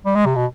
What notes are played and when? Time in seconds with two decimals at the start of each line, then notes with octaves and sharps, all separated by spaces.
0.05 G3
0.15 G#3
0.26 C3
0.35 B2